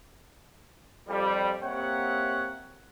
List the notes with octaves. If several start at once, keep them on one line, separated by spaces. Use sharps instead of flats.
F2 G3
A#3 C4 G4 C#5 E5 F#5